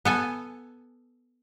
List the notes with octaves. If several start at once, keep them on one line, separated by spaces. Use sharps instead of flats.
B3 A4 G#5